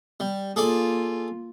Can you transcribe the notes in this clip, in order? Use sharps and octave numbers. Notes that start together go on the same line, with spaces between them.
G3
A#3 F4 G#4 A4 D5